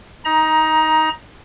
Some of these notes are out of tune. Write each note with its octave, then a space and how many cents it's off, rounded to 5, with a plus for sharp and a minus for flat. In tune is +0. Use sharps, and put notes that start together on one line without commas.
D#4 +10 A#5 +20